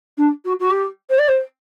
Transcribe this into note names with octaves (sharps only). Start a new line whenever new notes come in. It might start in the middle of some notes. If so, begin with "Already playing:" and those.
D4
F#4
F#4
G4
C5
D5
C5